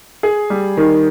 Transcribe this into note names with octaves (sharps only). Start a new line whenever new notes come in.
G#4
G3
D#3